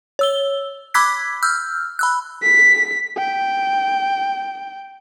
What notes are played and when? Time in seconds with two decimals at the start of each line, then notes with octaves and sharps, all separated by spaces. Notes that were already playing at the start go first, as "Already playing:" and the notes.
0.19 C#5 E6 G7
0.94 B5 D6 E6 F#6 G#6 B6
1.43 E6 F6 G6
1.99 B5 E6 F#6
2.43 B6
3.18 G5